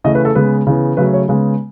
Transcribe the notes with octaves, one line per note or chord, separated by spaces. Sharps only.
C#3 E3 A3 D#5
B4
A4
C#3 G#3 B3 B4
C#3 E3 B3
C#3 F#3 A3 B4
C#5
C#3 G#3 B3